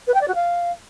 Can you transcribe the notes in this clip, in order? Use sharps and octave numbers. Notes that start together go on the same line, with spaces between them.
B4
G5
D5
F#4
F5